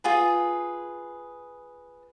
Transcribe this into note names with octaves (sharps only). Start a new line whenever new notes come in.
F4 G#4 B4